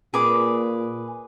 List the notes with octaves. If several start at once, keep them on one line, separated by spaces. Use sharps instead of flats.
A#2 G#4 B4 D6